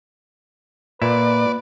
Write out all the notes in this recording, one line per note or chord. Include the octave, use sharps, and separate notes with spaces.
A#2 A#3 B4 D5 E5